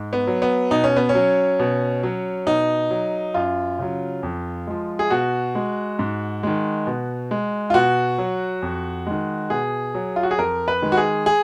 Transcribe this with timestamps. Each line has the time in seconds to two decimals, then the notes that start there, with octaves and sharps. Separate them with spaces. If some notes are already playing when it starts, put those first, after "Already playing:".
Already playing: G#2
0.13 B3
0.27 F#3
0.42 B3
0.71 B2 D#4
0.84 C#4
0.96 B3
1.09 C#4
1.15 F#3
1.60 B2
2.03 F#3
2.47 B2 D#4
2.90 F#3
3.34 F#2 F4
3.79 C#3 F#3
4.23 F2
4.67 F3 G#3
4.99 G#4
5.10 B2 F#4
5.55 G#3
5.99 G#2
6.43 D#3 G#3
6.87 B2
7.31 G#3
7.70 F4
7.74 B2 F#4
8.18 F#3
8.62 F2
9.07 D#3 G#3
9.50 B2 G#4
9.94 F#3
10.16 F4
10.23 F#4
10.31 G#4
10.38 F2 A#4
10.68 B4
10.82 D#3 G#3
10.92 F#4
10.97 G#4
11.26 G#4